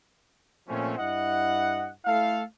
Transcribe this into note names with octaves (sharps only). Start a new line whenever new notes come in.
A#2 F3 A3 C4 C#4
G2 E4 D#5 F#5
A3 E4 A4 F5